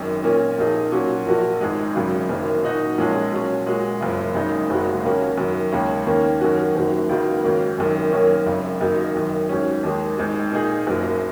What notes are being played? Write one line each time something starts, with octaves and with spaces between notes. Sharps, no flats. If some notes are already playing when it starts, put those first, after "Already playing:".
Already playing: G#1 F#2 D#3
A#2 A#3 C#4
A#1 A#2 A#3 D#4 G#4
A#2 F#3 C#4 F#4
A#1 A#2 A#3 F#4
G#1 G#2 G#3
G#1 F#2 C#3 F#3
F#1 F#2 D#3 F#3 A#3
A#2 F#3 D#4 F#4
A#1 A#2 G#3 C#4
A#2 F#3 C#4
A#2 G#3 F#4
F#1 F#2 C#3
G#1 F#2 C#3 G#3 D#4
F#1 F#2 C#3 G#3 F#4
D#2 C#3 A#3 C#4 F#4
F#2 D#3 F#3
D#2 C#3 G#3 C#4
D#2 D#3 A#3 C#4
F#2 D#3 A#3 C#4 F#4
F#1 F#2 D#3 F#3
C#2 C#3 F#3 A#3 D#4
G#2 D#3 F#3 A#3 C#4
G#1 F#2 D#3
F#2 D#3 A#3 C#4
G#1 F#2 C#3
G#1 F#2 F#3 A#3 D#4
G#1 F#2 D#3
G#2 F#3 C#4
D#2 D#3 G#3
G#1 G#2 G#3
A#2 A#3 D#4 G#4
F#1 F#2 F#3 A#3